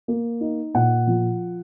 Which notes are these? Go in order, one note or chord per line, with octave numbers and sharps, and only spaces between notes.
A#3
D#4
A#2 F#5
F3